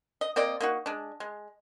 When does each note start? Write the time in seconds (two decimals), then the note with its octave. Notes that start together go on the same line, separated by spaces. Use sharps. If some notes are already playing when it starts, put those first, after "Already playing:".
0.21 D#5
0.36 A#3 C4 D5 D#5
0.61 A#3 D#4 F#4
0.86 G#3 D4
1.20 G#3